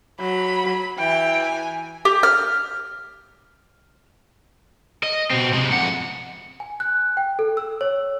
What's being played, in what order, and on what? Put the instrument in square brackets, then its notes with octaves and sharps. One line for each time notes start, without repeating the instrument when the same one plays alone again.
[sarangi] F#3 [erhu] B5
[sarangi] E3 [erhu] G5
[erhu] G#5
[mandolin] G4
F6
[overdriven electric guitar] D#5
B2 C4
C3 G#3
F2 F#5
[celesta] G#5
F#6
G5
A4
E6
C#5